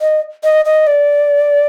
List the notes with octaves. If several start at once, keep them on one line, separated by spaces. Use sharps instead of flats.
D#5
D#5
D#5
D5